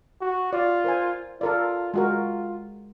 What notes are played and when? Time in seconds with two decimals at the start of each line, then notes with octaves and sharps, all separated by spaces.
0.21 F#4
0.53 F4 D5
0.84 A#4 C5 G#5
1.41 F4 A4 A#4 D5
1.94 G#3 F4 F#4 A#4